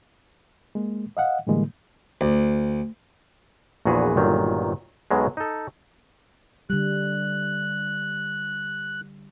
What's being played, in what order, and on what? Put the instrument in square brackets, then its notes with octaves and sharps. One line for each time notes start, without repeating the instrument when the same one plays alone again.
[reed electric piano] G#3 A#3
D#5 F5 F#5
A2 D3 E3 G3 G#3 A#3
[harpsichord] D2
[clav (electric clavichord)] A#1 E2 A#2 F#4 G#4 B4
G1 A#2 D#3 F#3
B1 B2 F#3 G#3
D#4 A4
[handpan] D3 G3 [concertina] F#6